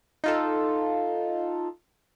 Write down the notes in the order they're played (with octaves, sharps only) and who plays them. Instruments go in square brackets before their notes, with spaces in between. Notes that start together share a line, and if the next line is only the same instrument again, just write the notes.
[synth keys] D#4 F4 A4